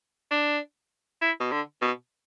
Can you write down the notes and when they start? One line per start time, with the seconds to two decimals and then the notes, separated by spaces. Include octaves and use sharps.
0.31 D4
1.22 E4
1.40 B2
1.52 D3
1.82 B2